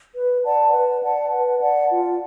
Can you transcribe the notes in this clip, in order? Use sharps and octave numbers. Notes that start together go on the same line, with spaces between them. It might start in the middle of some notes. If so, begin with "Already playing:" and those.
B4
D5 F#5 A5
B4
D5 F#5 A5
B4
D5 F#5 A5
F4